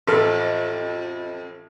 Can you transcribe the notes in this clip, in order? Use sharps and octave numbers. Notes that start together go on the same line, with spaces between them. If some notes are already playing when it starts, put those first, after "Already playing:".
A1 F2 A4 F6